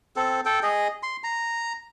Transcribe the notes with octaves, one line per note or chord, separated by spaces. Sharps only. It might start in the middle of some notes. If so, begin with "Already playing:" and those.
C4 A4
A4 G5
G#4 D#5
C6
A#5